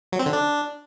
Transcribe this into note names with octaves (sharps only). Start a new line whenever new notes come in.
F#3
C4
D3
D4